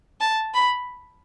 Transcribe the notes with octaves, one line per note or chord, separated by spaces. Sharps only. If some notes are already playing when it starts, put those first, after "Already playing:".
A5
B5